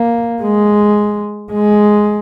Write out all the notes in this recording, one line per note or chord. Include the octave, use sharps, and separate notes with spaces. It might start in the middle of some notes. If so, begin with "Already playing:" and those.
Already playing: A#3
G#3
G#3